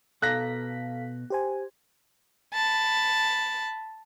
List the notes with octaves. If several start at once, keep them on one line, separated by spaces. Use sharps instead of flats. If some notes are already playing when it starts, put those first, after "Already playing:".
B2 A4 F5 A#5 F#6 A#6 B6
G4 C5 G#5
A5 B5